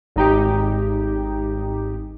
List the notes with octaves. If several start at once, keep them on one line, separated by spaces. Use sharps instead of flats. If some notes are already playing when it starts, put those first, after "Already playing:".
G#1 D#4 G4